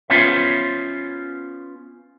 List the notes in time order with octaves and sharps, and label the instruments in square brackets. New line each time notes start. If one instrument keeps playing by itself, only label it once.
[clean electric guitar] B3 C#4 F4 C5 C#5 E5